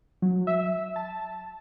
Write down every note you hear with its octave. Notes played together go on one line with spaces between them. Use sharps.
F#3
E5
A5